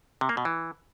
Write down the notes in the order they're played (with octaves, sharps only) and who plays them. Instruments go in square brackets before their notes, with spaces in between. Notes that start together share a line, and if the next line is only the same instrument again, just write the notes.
[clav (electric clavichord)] C3
A#3
B2
E3